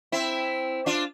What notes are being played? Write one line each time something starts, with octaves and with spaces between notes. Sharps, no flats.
C4 E4
D4 F4